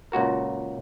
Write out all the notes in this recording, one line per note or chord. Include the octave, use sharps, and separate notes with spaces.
C#2 A#2 F#4 A#4